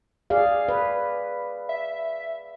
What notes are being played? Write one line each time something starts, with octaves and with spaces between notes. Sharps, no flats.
G#4 D5 F5
B4
E5